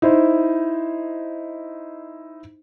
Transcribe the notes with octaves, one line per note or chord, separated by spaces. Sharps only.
D#4 E4 C5